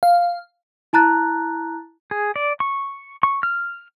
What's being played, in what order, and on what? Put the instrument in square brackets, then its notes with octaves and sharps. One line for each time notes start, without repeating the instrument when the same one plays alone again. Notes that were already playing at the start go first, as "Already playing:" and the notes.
[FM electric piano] F5
[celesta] E4 A5 A#5 F#6 A6
[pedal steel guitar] G#4
D5
C#6
C#6
F6